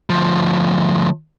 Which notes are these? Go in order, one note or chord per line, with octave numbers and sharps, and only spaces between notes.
D2 F3